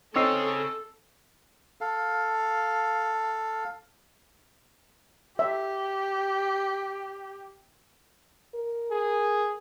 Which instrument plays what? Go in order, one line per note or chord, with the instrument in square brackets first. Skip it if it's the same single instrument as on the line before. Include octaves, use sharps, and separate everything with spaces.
[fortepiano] C4 D#4 [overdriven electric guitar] G#4 C#5 [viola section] A4 [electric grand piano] C#6 E6 C7
[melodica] A4 F5
[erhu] G4 [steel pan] E5
[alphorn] A#4
[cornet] G#4